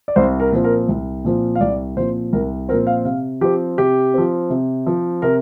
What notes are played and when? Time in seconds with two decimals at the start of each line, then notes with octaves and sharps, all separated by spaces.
0.08 D5
0.16 C2 C5
0.40 A#4
0.52 A#2 F3 C4
0.64 A#4
0.89 C2
1.24 A#2 F3 C4
1.55 F5
1.60 C2 D5
1.97 A#2 F3 C4 C5
2.33 C2 A#4
2.69 A#2 F3 C4 A#4
2.87 F5
3.05 C3 F5
3.41 F3 C4 G4
3.77 C3 G4
4.14 F3 C4
4.50 C3
4.86 F3 C4
5.22 C3 A#4